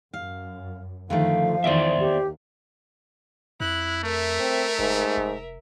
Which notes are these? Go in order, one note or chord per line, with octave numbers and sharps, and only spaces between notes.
F#2 F5
D3 D#3 F3 A3 F5
E2 D#3 C5 D5 E5
D#2 G4
F2 E4 F#6
A3 A#4 E5
C4
F#1 G#2
F1